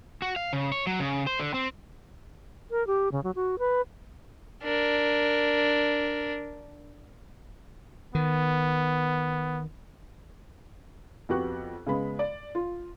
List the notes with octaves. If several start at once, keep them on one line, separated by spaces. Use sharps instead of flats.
F#4
F5
C#3
C#5
F#3
C#3
C5
D3
C4
A#4
G4
C#3
F#3
F#4
B4
D4 A#4
D#3 B3
F2 B3 F#4 G4 C#6 F#6
C#3 G#3 B3 B5
D5
F4